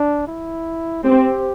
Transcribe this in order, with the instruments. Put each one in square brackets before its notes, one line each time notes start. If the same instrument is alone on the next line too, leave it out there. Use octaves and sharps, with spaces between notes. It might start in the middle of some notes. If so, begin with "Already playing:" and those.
Already playing: [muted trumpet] D4
E4
[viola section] C4 [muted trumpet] G4